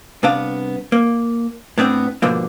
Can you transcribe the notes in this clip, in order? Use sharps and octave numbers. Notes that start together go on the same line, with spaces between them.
C2 B3 D4 F5
A#3
A2 B3 C4 D4
G#2 B2 D3 F3 A#3